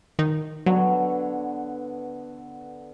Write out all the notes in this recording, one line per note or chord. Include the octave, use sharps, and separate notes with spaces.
D#3 D#4
D3 F#3 B3 C#5